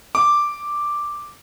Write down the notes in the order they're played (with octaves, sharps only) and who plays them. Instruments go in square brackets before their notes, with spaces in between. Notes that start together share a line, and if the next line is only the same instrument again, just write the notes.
[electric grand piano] D6